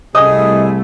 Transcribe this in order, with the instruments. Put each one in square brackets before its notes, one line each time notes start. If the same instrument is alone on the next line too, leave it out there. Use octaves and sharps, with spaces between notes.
[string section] C2 A3 [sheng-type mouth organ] G#4 [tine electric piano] D#5 [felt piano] D#6